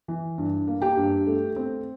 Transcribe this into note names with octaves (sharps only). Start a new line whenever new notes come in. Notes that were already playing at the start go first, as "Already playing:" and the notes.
E3
G2
A#3
G4 G5
G2
A3
C4